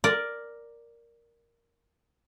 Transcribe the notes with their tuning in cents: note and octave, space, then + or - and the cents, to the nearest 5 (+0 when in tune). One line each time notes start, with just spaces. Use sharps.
A#4 +0 D5 +0